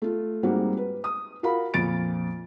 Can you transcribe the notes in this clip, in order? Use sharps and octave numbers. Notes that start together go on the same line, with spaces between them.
A3 F4
G#2 G3 A#3 C4 F#4
B4
D#6
F4 F#4 A#4 F5 B5
F2 A#2 F4 A6 D7